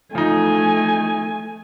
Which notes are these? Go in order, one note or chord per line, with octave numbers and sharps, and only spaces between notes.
F3 A3 D#4 G#5